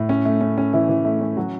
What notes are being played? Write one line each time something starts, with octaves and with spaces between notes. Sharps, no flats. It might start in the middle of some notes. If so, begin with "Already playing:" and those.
Already playing: A2
C#4
A3
C#4
C#4
E3 E4
E3
A3
C#4
F#3 F#4